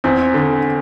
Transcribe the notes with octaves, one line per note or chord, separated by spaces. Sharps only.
E2 C4
D3